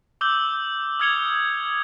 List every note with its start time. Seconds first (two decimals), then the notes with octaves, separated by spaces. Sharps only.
0.21 D6 E6 G6 F#7 G7
1.00 D#6 F6 G#6 C#7 F7 G7